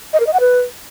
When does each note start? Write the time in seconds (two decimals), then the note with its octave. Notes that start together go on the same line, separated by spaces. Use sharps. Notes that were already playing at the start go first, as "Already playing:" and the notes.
0.13 D#5
0.20 A#4
0.27 D#5
0.33 F#5
0.40 B4